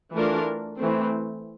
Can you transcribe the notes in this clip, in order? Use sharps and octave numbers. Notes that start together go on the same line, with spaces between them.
E3 A3 D4 F4 A#4
E3 A3 C4